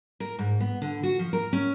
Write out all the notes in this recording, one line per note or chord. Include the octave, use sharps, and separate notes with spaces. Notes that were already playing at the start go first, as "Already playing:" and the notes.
A#4
G#2
B3
D3
F#4
F3
A#4
C#4